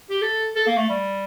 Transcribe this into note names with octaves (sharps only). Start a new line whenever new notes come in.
G4
A4
A4
A#3
A3
G3